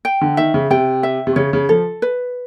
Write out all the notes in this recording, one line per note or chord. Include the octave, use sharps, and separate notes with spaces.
G5
D3
D#3 E5
C#3
C3 G5
E5
C3
C#3 C#5
C#3
F3 A4
B4